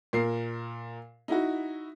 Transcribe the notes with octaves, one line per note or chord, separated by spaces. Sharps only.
A#2 A#4 C7
D#4 E4 F#4